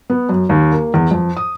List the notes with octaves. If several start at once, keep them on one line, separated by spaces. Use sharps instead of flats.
B3
F#2
D#2
A#3
E2
F2
D#6